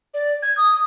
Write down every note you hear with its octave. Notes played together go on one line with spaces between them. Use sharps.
D5
G#6
D#6